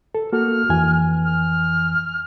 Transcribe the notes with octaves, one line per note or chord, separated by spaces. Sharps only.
A4
A#3 F#4 A4 F6
F2 E3 G#5
F6